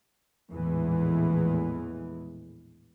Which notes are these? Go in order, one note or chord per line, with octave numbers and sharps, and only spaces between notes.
A#1 E2 A2 E3 G#3